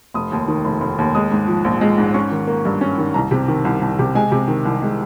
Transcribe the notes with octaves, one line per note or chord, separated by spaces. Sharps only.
F1 D#6
D#2
D#3
F1
F1
D#2
G#3 D#6
G#2
F3
A#1
G#3
G#2
C#4 C#6
D#3
A#3
G2
C#4
D#3
C2 A#5
C3
D#3
C2
C2
C3
G#3 G#5
C3
D#3
C2
G#3